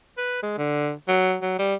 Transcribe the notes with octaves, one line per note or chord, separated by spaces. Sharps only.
B4
G#3
D3
F#3
F#3
G3